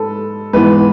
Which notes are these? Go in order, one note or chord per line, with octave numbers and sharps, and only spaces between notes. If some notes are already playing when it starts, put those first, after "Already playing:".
Already playing: G#2 A4 B4
G#2 E3 B3 B4